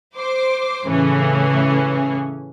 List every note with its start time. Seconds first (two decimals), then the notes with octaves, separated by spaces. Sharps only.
0.15 C5 D6
0.85 A2 C#3 E3 C#4